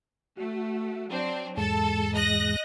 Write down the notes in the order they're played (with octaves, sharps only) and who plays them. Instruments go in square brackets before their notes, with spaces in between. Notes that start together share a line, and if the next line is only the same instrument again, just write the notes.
[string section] A3 [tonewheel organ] F#4
[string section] F#3 C4 D4
[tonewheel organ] E2 G#2 G#3 [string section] A4 A5
[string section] D#5 F#6 A#6